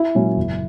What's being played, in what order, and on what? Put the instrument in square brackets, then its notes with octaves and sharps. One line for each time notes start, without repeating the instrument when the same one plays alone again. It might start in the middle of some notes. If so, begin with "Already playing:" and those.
Already playing: [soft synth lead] E4
[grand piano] A#2 F#3 C#4
F#1